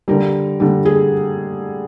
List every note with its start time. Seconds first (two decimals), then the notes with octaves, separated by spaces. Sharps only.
0.08 D3 G3 A#4
0.60 D3 G3
0.85 G#4